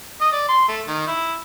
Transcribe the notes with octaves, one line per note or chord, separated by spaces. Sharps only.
D#5
D5
C6
A3
D#3
E4